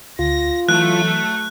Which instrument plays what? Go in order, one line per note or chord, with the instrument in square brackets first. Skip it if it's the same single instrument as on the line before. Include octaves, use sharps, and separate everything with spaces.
[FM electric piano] D2 [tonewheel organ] F4 [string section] A#6
[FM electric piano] E3 [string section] F#3 A3 [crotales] F#6